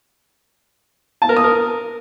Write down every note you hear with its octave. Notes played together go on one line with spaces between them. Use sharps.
A5
A#4
D#6
A#4